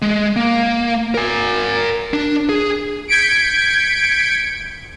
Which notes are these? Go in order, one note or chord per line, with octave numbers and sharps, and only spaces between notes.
G#3
A#3
A#4 G#5
D4
G#4
G6 G#6 B6 C#7 D7